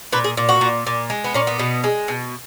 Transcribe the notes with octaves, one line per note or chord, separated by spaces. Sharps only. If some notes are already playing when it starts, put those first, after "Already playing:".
A#2 B4
G#4
A#2
F#4
A#2
A#2
G#3
B3
A#2 C#4
B3
B2
G#3
B2